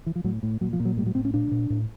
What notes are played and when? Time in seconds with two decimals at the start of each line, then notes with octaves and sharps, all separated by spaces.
0.06 E3
0.16 F3
0.24 A2 F#3
0.43 A2
0.61 A#2 F#3
0.73 F3
0.80 A#2
0.85 F#3
0.97 A2 G3
1.06 F#3
1.15 A2 C4
1.25 C#4
1.34 A#2 D4
1.51 A#2
1.70 A2